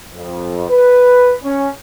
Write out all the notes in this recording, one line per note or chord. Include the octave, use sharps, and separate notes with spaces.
F2
B4
C#4